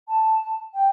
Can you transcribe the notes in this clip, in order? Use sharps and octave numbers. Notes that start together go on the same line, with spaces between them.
A5
G5